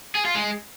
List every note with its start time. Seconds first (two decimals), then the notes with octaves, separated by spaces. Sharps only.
0.15 G#4
0.25 F4
0.35 G#3